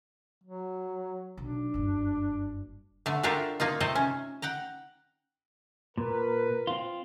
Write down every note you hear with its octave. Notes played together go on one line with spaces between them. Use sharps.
F#3
B1 D4
F#1 G2
D3 A3
A3 D4 F4 G4 A4 A#4
A#3 D#4 F4
C3 A3 A4 C5 D#5
C#4
F#5 G5 A#5
A#2 A#4 B4
C4 F4